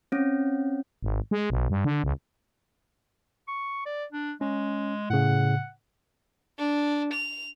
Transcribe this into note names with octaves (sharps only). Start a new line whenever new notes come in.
C4 C#4
G#1
G#3
B1
G2
D3
C#2
C#6
D5
D4
G#3 C#4
A2 C#3 F#5
D4
F7